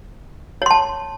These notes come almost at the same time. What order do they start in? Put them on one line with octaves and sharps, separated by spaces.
C#5 C6 A5